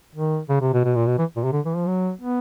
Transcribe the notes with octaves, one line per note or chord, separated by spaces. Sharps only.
D#3
C#3
C3
B2
B2
A#2
B2
E3
A#2
C3
D3
E3
F3
F#3
B3